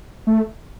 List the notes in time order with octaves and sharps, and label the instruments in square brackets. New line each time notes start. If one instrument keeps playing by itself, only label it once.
[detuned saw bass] A3